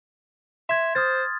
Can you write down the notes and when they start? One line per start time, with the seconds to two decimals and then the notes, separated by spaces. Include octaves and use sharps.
0.69 E5 C6 G#6
0.95 C5 D#6 F6 A6